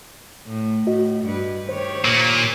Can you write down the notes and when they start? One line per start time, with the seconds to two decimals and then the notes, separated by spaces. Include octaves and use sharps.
0.46 A2
0.87 A2 F#4 D#5
1.25 G2 B4
1.69 D#3 G4 C5 C#5
2.05 A#2